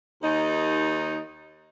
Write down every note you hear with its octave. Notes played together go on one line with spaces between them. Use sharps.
D#2 D#4